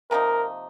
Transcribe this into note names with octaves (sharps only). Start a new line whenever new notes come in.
C3 F3 A#3 D#4 A#4